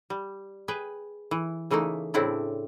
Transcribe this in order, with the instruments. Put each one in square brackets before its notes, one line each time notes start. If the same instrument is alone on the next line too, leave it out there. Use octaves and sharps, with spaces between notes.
[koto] G3
G#4 B4 G5
E3
C#3 E3 A3 A#3 D#4
A2 C#3 C4 D4 E4 D5